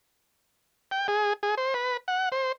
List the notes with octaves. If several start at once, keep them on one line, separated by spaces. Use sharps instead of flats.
G5
G#4
G#4
C5
B4
F#5
C5